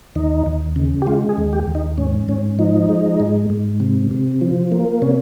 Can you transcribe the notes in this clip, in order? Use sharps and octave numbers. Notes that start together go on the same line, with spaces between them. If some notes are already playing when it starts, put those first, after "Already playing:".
D#2 D#4
D#2
C#3
G4
G#3 F4
G#4
D#2
G4
D#2
D#4
G#2 C#4
G#2 C#4
F3 D#4
G#3
G#2
G#2
C3
C3
F3
A#3
C3 C#4